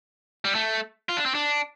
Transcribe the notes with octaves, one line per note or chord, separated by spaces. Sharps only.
G3
A3
F4
D4
C4
D4